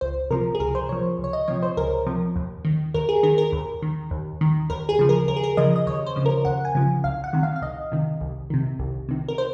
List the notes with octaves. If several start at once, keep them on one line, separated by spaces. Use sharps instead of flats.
C#2 C5
C3 F3 A#4
G#4
C#2 A#4
C5
C3 F3 C#5
C#2
C#5
D#5
C3 F3 C#5
C5
C#2 A#4
C3 F3
D#2
D#3
D#2 A#4
G#4
D#3 A#4
A#4
D#2
D#3
D#2
D#3
D#2 A#4
G#4
C#3 F3
A#4
D#2 A#4
G#4
A#4
C#3 F3 D#5
D#5
D#2 C#5
C5
C#3 F3
A#4
D#2 F#5
G#5
C#3 F3
C2 F5
F#5
C3 D#3
F5
F5
C2 D#5
C3 D#3
C2
C3 D#3
C2
C3 D#3
A#4
C5